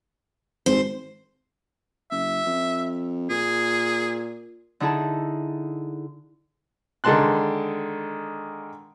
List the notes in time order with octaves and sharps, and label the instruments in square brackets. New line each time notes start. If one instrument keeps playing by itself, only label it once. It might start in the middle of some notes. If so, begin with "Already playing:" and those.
[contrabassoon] G#1 [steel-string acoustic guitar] C5
[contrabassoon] F#1 [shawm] E5
[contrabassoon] F2
[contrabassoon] A#2 [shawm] G#4
[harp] D3 D#4 E4 G#4 A5
[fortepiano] D3 D#3 G#3 A5 C6 F#6